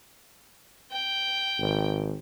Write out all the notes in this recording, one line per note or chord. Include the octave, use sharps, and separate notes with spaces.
G5
G#1